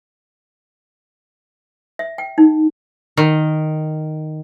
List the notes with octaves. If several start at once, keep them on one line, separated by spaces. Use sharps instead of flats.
E5
G5
D#4
D#3